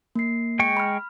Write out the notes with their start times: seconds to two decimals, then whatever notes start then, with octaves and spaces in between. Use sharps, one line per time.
0.15 A#3 C7
0.59 G#3 G5 C#6
0.77 B5 F6